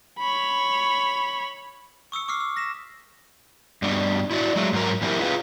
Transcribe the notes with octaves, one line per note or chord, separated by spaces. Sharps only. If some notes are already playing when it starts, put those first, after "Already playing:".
C#5 B5
C#6 D#6 E6 C#7
C#6 D6 E6 F6 C7
E6
A#6 B6 E7
G2 B2 D4
E4 F#4 D5
F#3 G#3 A3
G#2 F#3 A#4
A#2 E3 C4 E4 G4 A#4
F4 G#4 B4 F5